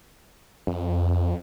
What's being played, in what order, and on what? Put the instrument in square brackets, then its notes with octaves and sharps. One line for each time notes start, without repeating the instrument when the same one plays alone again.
[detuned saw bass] F2